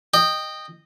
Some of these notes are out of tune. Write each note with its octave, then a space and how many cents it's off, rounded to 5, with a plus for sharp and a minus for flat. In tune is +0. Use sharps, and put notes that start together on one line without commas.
D#5 -15 G5 +10